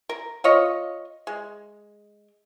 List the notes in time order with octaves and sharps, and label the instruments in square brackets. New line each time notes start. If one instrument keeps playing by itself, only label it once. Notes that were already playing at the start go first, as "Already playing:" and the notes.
[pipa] A#4
F4 C#5 D#5
G#3